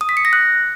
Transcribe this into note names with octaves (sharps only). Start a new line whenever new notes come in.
D#6
B6
C#7
A#6
F#6